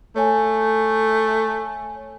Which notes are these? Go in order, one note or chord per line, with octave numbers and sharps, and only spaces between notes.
A3 C#5 G#5